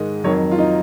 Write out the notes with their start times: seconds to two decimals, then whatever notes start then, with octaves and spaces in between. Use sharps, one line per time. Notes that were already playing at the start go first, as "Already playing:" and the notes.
Already playing: G#2 D#3 G#3 D#5
0.24 F2 D#3 F#3 C#5
0.51 F4
0.58 D#4